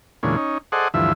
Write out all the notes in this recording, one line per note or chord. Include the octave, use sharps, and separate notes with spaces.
E2 A#2 D3 G#3 C#4
C#4 D#4
G#4 A4 C5 D5 D#5 F#5
D2 G2 E3 F3 E5